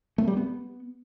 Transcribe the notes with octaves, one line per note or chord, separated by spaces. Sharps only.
A3
G3
B3